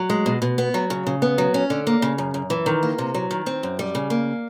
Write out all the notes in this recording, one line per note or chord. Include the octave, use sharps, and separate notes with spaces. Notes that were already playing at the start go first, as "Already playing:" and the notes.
Already playing: F#3
G#3
B2
B2
B3
F#3
C#3
C#3
B3
F#3
C#4
D3
A#3
C#3
F#2
F#2
E3
D#3
A#3
C3
F#3
D#3
C4
F#2
G3
C#3
A#3